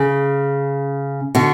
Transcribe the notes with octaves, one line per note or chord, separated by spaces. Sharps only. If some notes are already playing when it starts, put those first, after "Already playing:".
Already playing: C#3
B2 D3